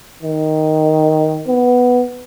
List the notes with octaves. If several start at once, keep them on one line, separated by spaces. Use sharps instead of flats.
D#3
B3